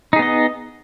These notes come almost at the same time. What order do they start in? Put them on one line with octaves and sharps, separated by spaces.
D#4 G#4 B3 D#5